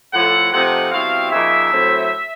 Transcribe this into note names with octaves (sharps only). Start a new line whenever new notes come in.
A2 F3 A3 F#5
C3 F3 A3 C4 D#4 F#5
B2 G3 C4 E4 F5
C#3 F3 A#3 D#4 E5
A2 F#3 A3 C4